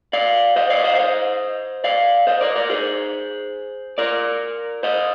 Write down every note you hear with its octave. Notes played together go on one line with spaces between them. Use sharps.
D5 F5
C5 D#5
D5 F5
C5 D#5
F5
C5 D#5
D5 F5
C5 D#5
A#4 D5
A#4 D5
G#4 C5
A#4 D5
C5 D#5